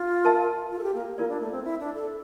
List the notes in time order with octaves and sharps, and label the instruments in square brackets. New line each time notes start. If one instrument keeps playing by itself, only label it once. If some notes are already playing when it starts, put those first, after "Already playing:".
Already playing: [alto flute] F4
[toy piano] A#4 E5 A5
[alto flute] F4
A4
G4
A#3
[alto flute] A#3 [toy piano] F4 A#4 D5
[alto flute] D4
A3
C4
E4
D4
A4